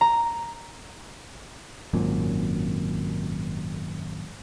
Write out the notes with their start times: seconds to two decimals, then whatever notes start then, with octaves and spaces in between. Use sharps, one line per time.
0.01 A#5
1.93 G#1 F#2 A#2